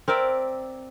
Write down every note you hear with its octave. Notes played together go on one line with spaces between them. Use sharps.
C4 A#4 D5 E5